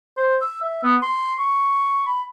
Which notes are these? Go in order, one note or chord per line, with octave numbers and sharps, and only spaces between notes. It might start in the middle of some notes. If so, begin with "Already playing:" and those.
C5
E6
E5
B3
C6
C#6
B5